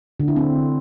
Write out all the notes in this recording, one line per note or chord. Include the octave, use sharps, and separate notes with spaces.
D3
E4
C4